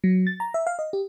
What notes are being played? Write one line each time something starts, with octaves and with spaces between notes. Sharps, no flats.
F#3
A6
A#5
E5
F5
D#5
G4